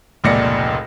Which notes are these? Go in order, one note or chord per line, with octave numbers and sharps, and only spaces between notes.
F1 C#2 A#2 D5 A#6 C#7